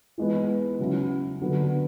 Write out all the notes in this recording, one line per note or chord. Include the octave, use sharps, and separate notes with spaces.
E3 G#3 B3
C#3 F#3 C#4 E4
D3 F#3 B3